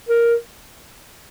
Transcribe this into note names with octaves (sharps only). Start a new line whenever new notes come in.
A#4